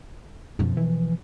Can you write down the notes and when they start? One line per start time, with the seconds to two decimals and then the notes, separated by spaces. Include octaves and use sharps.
0.59 F#2 B2 F3
0.77 E3